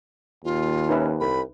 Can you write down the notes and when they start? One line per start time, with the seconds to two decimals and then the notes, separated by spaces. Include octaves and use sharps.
0.45 D#2 F4
0.89 C#4 D#4 B4 E5
1.20 C2 B5